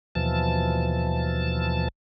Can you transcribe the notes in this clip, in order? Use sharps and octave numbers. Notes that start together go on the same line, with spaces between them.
D#2 B2 E3 F3 A5